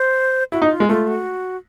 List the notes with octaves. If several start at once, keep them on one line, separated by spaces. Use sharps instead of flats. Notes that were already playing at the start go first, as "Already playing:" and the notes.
Already playing: C5
E4 F#4
D#4
F4
G#3
A3 F4
F#4